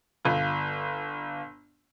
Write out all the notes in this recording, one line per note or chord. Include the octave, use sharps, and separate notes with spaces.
G1 F4